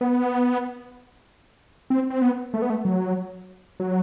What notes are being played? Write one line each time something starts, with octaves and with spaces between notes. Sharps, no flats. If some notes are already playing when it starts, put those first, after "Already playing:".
B3
C4
C4
B3
A3
B3
A3
F#3
F#3